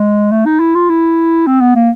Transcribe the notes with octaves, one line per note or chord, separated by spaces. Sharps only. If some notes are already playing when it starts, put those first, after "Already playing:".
Already playing: G#3
A3
D#4
E4
F4
E4
C4
B3
A#3